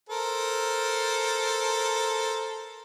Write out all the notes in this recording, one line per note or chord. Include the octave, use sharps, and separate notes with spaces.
A4 A#4 C5